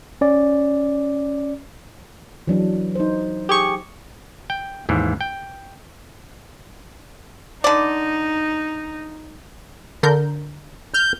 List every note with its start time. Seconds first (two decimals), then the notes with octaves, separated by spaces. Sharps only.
0.21 C#4 D5
2.47 E3 F#3 D4
2.95 D#4 C5
3.49 G4 G#4 C#6
4.50 G5
4.89 D#2 G#2 E3
5.21 G5
7.64 D3 D#4 D5
10.03 D3 A#4 G6
10.94 F6 G6